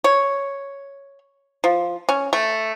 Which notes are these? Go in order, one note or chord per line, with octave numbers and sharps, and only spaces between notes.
C#5
F3
C#4
A3